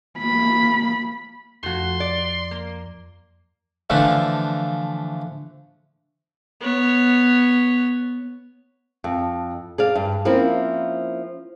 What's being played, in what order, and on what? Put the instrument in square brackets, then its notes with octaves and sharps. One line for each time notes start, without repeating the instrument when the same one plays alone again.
[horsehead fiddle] A#3 B5
[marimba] F2 F3 [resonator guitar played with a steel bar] A3 F#4 [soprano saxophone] C6
[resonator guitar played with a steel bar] D5
A#3
[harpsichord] D3 E3 F3 A3
[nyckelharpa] B3 C#5
[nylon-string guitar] F2
G#4 D5 F5
G2
F3 A#3 C4 C#4 E4